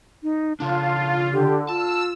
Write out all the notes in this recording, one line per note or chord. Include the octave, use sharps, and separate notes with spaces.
D#4
C#3 D4 F4 A5
D3 G4
F4 A5 E6